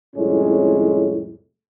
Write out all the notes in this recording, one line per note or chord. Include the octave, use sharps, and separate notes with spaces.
C2 F2 A2 G#3 C#4